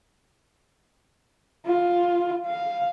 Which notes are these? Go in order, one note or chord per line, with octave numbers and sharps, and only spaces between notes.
F4
F5